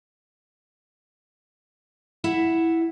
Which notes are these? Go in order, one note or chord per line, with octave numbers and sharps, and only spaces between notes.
E4 E5 F#5